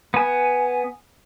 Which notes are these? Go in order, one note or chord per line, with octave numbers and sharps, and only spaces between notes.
B3 G#5